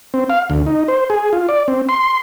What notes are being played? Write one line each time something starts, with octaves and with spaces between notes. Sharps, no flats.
C4
F5
D2
D#4
C5
G#4
F4
D5
C4
C6